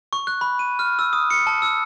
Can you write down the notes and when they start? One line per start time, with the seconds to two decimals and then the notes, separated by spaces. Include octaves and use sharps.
0.13 C#6
0.27 F#6
0.41 B5
0.59 D#7
0.79 F6
0.99 E6
1.13 D#6
1.30 C#7
1.47 A5
1.62 E6